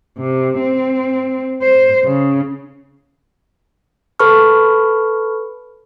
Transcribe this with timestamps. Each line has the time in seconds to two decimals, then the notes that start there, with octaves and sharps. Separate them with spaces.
0.18 C3
0.60 C4
1.62 C5
2.05 C#3
4.19 A4 B4 A5 B5 C#6 F6